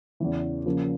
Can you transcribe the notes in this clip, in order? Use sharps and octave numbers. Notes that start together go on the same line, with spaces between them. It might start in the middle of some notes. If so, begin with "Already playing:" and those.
E2 C#3 E3
C#3 F3 A#3